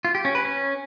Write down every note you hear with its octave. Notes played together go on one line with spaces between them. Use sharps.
F4
G4
C#4
B4
C#4